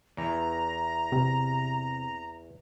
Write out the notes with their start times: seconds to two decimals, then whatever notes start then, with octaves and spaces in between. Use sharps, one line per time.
0.17 E2 E3 A#5
1.12 C3